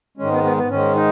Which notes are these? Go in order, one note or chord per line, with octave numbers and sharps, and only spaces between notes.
G#2 D#3 G#3 C#4
B3
B3
B3
G#2 D#3 G#3 C#4
D#4